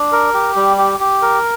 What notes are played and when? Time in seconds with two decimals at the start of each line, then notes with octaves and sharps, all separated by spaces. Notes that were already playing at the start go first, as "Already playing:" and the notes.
Already playing: D4
0.12 A#4
0.34 G4
0.56 G3
0.78 G4
1.00 G4
1.22 A#4